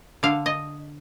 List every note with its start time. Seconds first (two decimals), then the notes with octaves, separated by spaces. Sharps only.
0.23 D3 F5
0.46 D#5